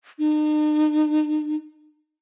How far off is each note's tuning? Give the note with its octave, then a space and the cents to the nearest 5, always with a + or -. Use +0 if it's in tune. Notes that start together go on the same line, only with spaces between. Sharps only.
D#4 -45